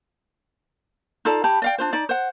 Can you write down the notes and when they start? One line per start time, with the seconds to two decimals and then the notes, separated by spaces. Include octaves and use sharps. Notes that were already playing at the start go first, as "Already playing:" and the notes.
1.25 D#4 F4 A4 D5
1.44 G4 A5 B5
1.62 D5 F5 G5
1.78 D4 F4 C5
1.93 D#4 D5
2.09 C5 F#5